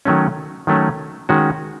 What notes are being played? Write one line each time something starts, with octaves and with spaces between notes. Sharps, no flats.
D#3 F#3 A3 C#4
D#3 F#3 A3 C#4
D#3 G#3 C#4 F#4